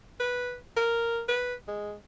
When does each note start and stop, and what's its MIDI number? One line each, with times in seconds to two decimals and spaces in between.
0.20 0.56 71
0.77 1.21 70
1.29 1.54 71
1.68 1.94 56